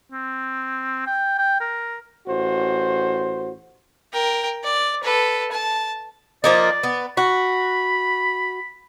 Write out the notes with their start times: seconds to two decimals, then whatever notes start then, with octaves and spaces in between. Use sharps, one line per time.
0.12 C4
1.06 G5
1.38 G5
1.61 A#4
2.27 A1 F#4 C5
4.13 A#4 G5
4.63 D5
5.03 A4 B4
5.51 A5
6.44 F3 A#3 D#4 D5
6.83 B3
7.17 F#4 B5